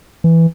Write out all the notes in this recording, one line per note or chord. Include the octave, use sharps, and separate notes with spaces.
E3